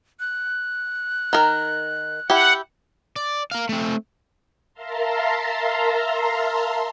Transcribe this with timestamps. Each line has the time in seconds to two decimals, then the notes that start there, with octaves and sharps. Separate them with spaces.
0.20 F#6
1.33 D#3 A#4
2.30 E4 G4 F#5
3.16 D5
3.51 A#4 F5
3.69 A3 C4
4.73 A#4 E5 F5 A5 A#5 C6